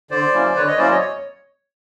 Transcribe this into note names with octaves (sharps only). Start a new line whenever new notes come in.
D3 C5 D5
F#3 A#3 C#4 E4
D3 B4 C#5
C#5 D#5
F#3 A#3 C#4 E4 C5 D5
C#5 D#5
C#5